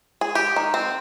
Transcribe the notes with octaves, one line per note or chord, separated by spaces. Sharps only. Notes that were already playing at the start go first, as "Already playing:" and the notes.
G#4
G4
D#3
C4